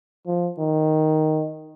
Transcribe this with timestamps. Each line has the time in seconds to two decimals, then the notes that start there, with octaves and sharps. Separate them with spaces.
0.27 F3
0.59 D#3